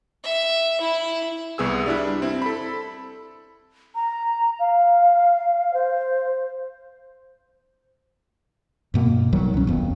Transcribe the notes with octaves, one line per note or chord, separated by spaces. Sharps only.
E5
E4
C2 B3 G#4 E6
G3 D4 E4
C4 E4
A4 B5
A#5
F5
C5
G2 B2 A#3
B1 D#3 F#3 G3
C2 C#4
D#1 F2 B3